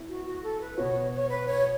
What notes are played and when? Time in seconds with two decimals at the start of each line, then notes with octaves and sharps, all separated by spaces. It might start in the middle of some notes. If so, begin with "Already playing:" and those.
Already playing: B3 E4
0.08 F#4
0.26 F#4
0.43 A4
0.60 B4
0.77 B2 B3 F#4 C#5
1.12 C#5
1.29 B4
1.46 C#5